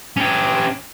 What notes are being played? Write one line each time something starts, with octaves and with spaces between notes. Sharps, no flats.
C#4 G4